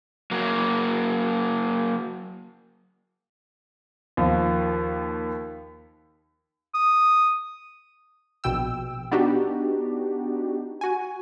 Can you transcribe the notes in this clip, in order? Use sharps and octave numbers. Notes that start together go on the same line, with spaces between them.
F#3 A#3
D#2 F3
D#6
A#1 B2 G5 E6
B3 D4 D#4 F#4 G4
F#4 G#5